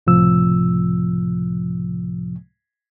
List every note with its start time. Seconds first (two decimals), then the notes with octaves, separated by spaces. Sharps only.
0.07 C#2 A2 C3 F3 E6